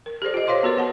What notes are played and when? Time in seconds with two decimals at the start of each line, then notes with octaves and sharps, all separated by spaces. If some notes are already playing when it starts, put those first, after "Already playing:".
0.06 A#4
0.22 G4 A4 C5 D5
0.34 F4 D#5
0.47 C5 C#5 F5 C6 D6
0.63 B3 F#4 A#4 B4
0.77 B3 F#5 A5